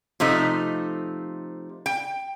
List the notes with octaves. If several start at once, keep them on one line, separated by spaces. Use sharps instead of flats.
C3 F3 A3 D#4
G5